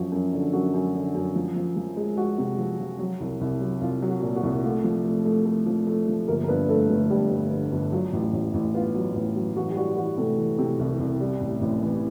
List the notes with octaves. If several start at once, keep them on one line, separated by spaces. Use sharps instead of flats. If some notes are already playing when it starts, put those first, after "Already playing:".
Already playing: F#2 F3 F#4
F#2
D3
F#2 F#4
F#2
D3
F#2
F3
F3
F3
G#3
G#3 F#4
C3
F3
F3
F#3
C2
C2
F#3
C2 F4
F#3
F#4
A#2
F#4
C2
A3 F4
F3
A3
A3
A3
F3
A3
F3
G1 A#3 A#4
A#4
G2 B3 B4
G2 A3 A4
G1 A3 A4
G2 G3 G4
G1
D3
G1
F#3 F4
A1
A1
A1
B3 F4
F#3
A1
F#3
E3 F#4
G4
G3 F#4
E3 F#4
C3 A3 A4
E3
C3
C2
C2
G3
A1
A1
E3